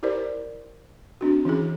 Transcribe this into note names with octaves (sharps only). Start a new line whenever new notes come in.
E4 G4 A#4 C5 D5
C4 D4 F#4
E3 C#4 E4 G#4